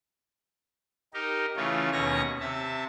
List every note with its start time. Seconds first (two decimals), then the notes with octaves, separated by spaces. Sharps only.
1.14 D#4 G4 A#4
1.57 C#3 E3 A3 F4 C#5
1.92 D#2 B2 C#4 C#5 C#6 A#6
2.41 C3 E5 A5